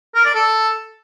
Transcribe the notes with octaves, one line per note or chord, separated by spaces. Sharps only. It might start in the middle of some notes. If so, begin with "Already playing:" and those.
A#4
D5
A4